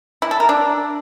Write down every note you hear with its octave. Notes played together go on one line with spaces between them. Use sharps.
E4
A4
A#4
D4